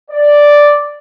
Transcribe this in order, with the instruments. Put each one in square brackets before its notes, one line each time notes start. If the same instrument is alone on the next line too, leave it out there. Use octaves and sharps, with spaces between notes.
[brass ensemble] D5